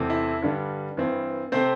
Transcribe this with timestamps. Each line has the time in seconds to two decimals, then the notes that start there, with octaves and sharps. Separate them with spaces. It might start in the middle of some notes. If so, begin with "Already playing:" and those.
Already playing: E2 C3 A3 C4
0.10 E4
0.42 G2 D3 G3
0.97 G2 E3 C4
1.52 C3 A3 C4 C5